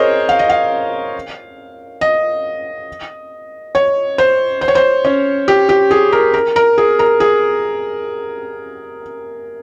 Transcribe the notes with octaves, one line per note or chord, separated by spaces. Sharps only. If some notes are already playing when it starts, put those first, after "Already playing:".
Already playing: G#4 A#4 C5 C#5 D#5
F5
D#5
F5
D#5
C#5
C5
C5
C#5
C5
C#4
G4
G4
G#4
A#4
A#4
A#4
G#4
A#4
G#4